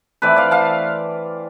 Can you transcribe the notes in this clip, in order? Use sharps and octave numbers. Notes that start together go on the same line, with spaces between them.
E3 A3 C4 B4 D5
D5 F5
F5 A5